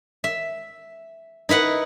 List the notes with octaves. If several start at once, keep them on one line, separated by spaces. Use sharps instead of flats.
E5
D#4 E4 B4 F#5